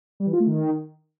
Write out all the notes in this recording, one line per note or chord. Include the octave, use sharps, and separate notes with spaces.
G3
E3
F4
A3
D#3